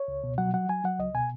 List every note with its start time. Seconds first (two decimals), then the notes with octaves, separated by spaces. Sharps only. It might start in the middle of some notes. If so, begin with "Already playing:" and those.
Already playing: C#5
0.08 C#2
0.24 B2
0.38 F#3 F#5
0.54 F#3 F#5
0.69 F#3 G#5
0.84 F#3 F#5
0.99 C#2 D#5
1.15 B2 G#5